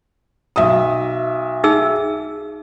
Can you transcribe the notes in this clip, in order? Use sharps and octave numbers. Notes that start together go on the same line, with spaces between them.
B1 E5 D#6
D#4 G#4 E6